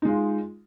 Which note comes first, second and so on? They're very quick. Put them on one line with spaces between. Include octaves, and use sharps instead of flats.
D#4 G#3 F4